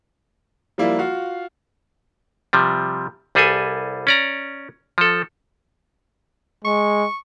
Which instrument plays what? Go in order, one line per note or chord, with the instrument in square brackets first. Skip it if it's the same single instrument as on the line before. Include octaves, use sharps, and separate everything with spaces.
[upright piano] F3 G3 A#3 E4
F4 F#4 F5
[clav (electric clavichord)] C3 F3 G3
C2 G3 G#4 A4 B4 G#5
C#4 D5 A#5
F3 A4
[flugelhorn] G#3 [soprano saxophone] C#6